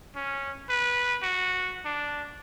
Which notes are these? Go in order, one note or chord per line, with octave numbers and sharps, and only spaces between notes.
C#4
B4
F#4
D4